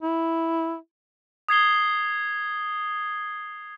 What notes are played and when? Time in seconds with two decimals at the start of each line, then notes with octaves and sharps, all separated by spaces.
0.02 E4
1.49 D#6 G#6 C7 G7